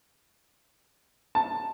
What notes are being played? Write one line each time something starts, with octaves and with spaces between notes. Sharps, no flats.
A5